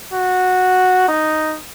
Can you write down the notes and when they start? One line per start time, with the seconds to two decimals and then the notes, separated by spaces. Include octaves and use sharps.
0.13 F#4
1.08 D#4